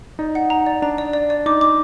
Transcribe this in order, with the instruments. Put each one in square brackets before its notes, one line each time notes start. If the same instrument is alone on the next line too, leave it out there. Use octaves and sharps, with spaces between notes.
[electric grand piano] D#4 [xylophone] D5
[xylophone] F#5
A#5
D5
[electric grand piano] D4 [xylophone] A#5
[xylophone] D5
D5
D5
[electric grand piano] D#4 [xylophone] D6
[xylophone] D6